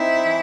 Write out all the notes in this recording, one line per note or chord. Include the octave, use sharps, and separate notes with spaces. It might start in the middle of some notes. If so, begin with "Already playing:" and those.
Already playing: C4 D#4 E4
E3